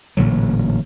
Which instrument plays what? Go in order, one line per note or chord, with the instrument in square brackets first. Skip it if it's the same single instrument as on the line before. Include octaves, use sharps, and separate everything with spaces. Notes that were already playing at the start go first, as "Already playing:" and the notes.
[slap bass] A1 A#2 D3 F#3